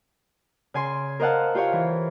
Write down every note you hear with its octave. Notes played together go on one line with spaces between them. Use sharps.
C#3 G#5 C6
A#4 C5 D#5 F5 F#5 A5
F4 G4 C5 C#5 F5
E3